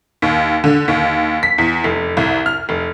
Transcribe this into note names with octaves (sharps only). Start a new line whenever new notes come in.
D#2
D3
D#2
B6
E2
F1
C2
F6
F1